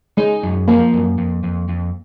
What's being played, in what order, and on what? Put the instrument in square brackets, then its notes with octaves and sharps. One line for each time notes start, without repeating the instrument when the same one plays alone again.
[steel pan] G#3 [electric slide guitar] D#4
[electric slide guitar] F#2
[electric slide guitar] F3 [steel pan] A#3
[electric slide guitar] F#2
F2
F2
F2